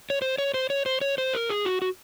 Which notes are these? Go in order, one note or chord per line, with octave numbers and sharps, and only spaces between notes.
C#5
C5
C#5
C5
C#5
C5
C#5
C5
A#4
G#4
F#4
F#4